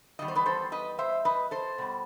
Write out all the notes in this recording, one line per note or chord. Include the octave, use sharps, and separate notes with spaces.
E2 D#3 G3 D#5
C5
B4 D#5
A4 C5
B4 D#5
C5 E5
B4 D#5
A4 C5
B2 G3